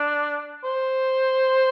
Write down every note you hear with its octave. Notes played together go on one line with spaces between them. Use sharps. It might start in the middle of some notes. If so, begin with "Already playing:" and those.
Already playing: D4
C5